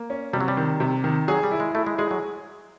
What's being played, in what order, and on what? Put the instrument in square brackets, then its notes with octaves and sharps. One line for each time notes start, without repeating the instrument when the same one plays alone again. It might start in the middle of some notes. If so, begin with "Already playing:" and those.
Already playing: [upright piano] A#3
C#4
[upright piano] C3 [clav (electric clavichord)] G3
[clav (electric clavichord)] F#3
G3
[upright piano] D#3
C3
D#3
[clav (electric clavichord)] F#3 [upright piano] G#4
[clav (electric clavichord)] G3
[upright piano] E4
[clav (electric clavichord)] G#3
[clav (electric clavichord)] A3 [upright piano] E4
[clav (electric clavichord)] G#3
[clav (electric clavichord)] G#3 [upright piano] G#4
[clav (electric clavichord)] F#3